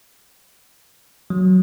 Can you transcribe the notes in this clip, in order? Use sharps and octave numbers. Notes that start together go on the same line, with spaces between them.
F#3